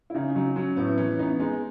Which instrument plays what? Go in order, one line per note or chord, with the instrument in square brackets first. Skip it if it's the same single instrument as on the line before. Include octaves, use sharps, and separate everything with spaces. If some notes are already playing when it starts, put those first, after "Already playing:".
[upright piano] E4
[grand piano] C#3 [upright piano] D#4
[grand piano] F#3 [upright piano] D#4
[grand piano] F#3 [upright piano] C#4
[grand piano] A2 [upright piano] B3
[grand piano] E3 [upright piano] C#4
[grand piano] B3 [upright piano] D#4
[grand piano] G#3 [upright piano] D#4